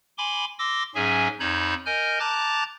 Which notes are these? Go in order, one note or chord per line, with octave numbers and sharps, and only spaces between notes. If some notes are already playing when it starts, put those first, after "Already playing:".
G#5 B5 C6 D6
C6 D6 E6 A#6
G#2 F#3 C#4 G#4 E5 G#5
F2 D#4 C#5 A5 B5 G6
A#4 D#5 G#5 F6 G6
A5 A#5 D6 F#6 G6 A6